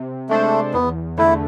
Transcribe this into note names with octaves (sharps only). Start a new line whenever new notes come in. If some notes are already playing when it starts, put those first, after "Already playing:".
Already playing: C3
G#3 A3 D4 A4 C5
E2 B3
D3 A3 E4